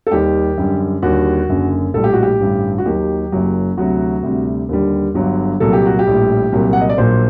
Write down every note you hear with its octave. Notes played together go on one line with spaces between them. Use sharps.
A4
D#2 D#3 G3 G4
F#2 D3 G3
D#2 D3 G3 F#4
F#1 F#2 D3
A#1 A2 G3 A4
G4
F#4
G4
A1 G2 D3
F#4
D#2 D#3 F#3 G4
F#1 F#2 F#3
D2 C3 F#3 F#4
D2 C3 G3
D#2 D3 G3
G1 G2 D3 F#3
C2 A#2 F#3 A4
G4
F#4
G4
A#1 A2 G3
C2 A#2 F#3
F#5
D#5
D5
A#1 A#2 F#3 C5